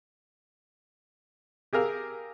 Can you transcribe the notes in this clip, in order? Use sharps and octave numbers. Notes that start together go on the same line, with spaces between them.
G4 G#4 A#4 F5 E6